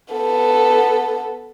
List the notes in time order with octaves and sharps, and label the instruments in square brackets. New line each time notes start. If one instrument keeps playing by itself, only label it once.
[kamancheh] B3 A4